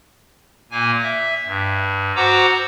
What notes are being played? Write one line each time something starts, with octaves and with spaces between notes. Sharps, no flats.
A#2 A#3 G#5
E5
G2
F#4 C5 F#5 A#5 D6 E6